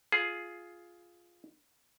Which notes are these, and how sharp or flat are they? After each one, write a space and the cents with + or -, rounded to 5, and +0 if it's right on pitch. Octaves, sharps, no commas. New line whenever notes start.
F4 +0 G#4 +10